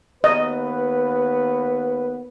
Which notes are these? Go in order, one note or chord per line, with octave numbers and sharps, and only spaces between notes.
D#2 B3 B4 D#5